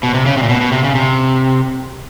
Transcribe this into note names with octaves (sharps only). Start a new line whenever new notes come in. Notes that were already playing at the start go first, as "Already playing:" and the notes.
B2
C3
C#3
C3
A#2
B2
B2
C3
C#3
C3